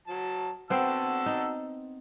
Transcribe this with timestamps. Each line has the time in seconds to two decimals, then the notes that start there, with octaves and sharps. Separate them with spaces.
0.07 F#3 A5
0.70 B3 C4 F#4 C5 A5 E6
1.26 D#4